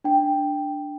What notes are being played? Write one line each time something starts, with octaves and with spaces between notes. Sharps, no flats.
D4 G5